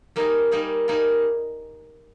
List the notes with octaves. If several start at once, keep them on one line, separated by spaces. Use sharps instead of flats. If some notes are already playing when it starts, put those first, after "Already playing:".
G3 A#3 D#4 G#4
G3 A#3 D#4 G#4
G3 A#3 D#4 G#4